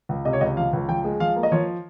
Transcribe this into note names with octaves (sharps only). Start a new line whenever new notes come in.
C#2
C3 D#5
C#5
C#2 D#5
F3 F5
C#2
F3 G5
G#3
F3 F5
A#3
D#5
F3 C#5